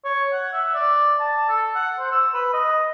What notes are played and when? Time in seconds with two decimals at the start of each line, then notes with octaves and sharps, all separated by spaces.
0.05 C#5
0.33 F#5
0.53 E5
0.74 D5
1.20 A5
1.49 A4
1.75 F#5
1.99 C5
2.12 E6
2.34 B4
2.53 D#5